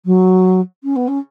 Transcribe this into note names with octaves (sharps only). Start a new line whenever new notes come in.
F#3
C#4
B3
C#4